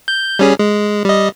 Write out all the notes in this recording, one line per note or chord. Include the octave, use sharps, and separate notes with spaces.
G6
G3 C#4 G#4
G#3
G3 D#5